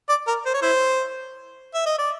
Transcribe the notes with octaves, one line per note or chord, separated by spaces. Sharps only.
D5
A#4
C5
C#5
E4 C5
E5
D#5
D5